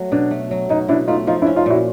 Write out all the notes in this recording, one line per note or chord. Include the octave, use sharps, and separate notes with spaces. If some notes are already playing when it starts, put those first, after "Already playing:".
Already playing: F#3 A3
B2 D4
A3
F#3
B2 D#4
B2 D4 E4
A3 D#4 F4
F3 D#4 F4
D4 E4
C#4
D#4 F4
A#2 E4 F#4